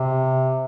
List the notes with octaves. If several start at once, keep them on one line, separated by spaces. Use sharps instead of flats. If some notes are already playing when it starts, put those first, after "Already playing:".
Already playing: C3